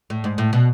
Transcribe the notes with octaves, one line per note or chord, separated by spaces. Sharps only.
A2
G#2
A2
B2